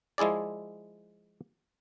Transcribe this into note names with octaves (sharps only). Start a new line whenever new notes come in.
F3 G#3 E4 G#4 D5